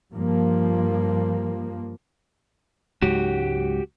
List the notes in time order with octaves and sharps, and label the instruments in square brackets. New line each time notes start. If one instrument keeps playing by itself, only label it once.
[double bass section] G2 F3 A#3
[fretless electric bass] C#2 G#2 F#3 [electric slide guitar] F#4 G4